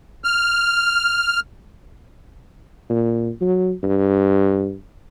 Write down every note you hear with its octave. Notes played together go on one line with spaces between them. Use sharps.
F6
A#2
F#3
G2